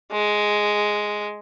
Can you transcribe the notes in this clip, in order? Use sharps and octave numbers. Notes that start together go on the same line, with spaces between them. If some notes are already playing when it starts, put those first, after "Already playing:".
G#3